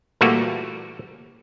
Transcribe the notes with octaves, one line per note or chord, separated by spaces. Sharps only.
A#2 E3 G3 A3 A#3 F#4